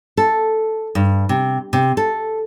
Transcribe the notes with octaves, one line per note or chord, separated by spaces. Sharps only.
A4
G2
C3
C3
A4